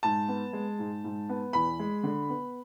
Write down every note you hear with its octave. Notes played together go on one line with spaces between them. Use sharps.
G#2 A5
B3
G#3
G#2
G#2
B3
E2 B5
G#3
D3
B3